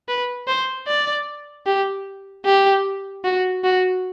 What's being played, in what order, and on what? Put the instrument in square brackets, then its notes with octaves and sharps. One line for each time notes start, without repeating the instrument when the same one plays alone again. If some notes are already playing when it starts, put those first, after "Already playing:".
[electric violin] B4
C5
D5
G4
G4
F#4
F#4